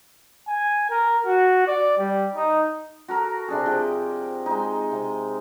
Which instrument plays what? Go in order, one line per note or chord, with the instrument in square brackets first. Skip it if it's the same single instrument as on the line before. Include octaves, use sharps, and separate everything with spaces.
[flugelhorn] G#5
A#4
F#4
D5
G3
D#4
[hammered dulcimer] F#4 A4 A#4
C3 D4 G#4
C3 F3 G4 D#5
G#3 D#4
C3